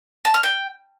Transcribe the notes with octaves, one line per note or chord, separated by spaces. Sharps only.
A5
F6
G5